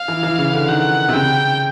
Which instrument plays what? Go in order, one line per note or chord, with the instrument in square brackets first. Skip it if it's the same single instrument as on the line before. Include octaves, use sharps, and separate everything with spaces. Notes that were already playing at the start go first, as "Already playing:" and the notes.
Already playing: [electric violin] F5
[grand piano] E3
E3
C#3
D3
[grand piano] D#3 [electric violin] F#5
[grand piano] C3
[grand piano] C#3 [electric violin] G5